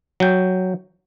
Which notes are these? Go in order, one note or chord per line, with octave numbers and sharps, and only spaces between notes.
F#3 G5